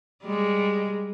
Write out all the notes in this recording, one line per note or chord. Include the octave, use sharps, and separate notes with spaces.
G3 G#3